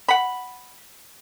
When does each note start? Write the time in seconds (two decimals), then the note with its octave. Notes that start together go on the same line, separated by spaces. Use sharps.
0.08 F#5 B5